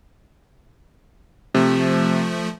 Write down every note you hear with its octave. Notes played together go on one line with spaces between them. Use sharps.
C3 F3 A3